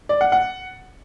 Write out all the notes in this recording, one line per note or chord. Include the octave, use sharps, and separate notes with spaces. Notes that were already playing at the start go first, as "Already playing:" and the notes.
D5
F#5
F#5